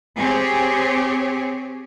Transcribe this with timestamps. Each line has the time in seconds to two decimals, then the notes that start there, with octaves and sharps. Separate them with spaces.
0.17 C4 G4 G#4 C#5